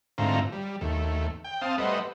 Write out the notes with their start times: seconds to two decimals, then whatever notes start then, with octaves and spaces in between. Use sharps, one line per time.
0.18 G#2 D3 A3 C4 F4 A#5
0.53 G3
0.81 D#2 A3
1.44 G5
1.62 C4 F5 A5 D#6
1.78 G3 A3 B4 C5 D#5 F#5